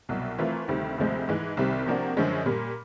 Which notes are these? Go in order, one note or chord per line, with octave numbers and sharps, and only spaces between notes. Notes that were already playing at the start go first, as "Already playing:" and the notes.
C2 B2 F#3
E3 A3 C4 F4 A#4
D2 C3 D#3 G3 C4
D2 C3 F3 G#3
G#2 E3 G#3
C2 C3 D#3 G3 C4
C3 F3 A#3 D4 F#4
F#2 D3 F3 G#3 C#4
A#2 G3 A#3